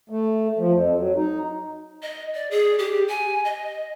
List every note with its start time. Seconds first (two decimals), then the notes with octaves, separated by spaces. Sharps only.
0.10 A3
0.59 F3
0.73 F2
0.96 F#3
1.16 D#4
2.02 D#5
2.35 D5
2.51 G#4
2.79 G4
3.09 G#5
3.45 D#5